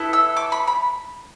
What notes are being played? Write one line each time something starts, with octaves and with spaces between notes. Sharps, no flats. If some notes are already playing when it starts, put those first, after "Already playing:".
Already playing: B3 E4 A4
E6
D6
B5
B5